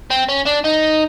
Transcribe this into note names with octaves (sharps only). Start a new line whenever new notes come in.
C4
C#4
D4
D#4